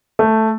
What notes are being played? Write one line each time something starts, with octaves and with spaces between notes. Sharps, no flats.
A3